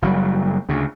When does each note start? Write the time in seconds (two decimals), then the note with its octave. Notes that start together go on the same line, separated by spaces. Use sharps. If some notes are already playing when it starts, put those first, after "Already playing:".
0.02 F#1 F#3 G3
0.69 D2 C#3